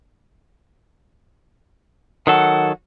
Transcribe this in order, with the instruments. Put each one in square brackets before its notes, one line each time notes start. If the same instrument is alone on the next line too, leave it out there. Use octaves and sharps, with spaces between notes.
[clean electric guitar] D#3 F#3 A4 [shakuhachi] F#5